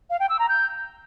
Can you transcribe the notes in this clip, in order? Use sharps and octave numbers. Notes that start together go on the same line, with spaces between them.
F5
G5
E6
A#5
G6